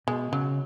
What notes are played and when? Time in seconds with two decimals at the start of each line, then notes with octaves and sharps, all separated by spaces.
0.07 B2 G#3
0.32 C#3 F#3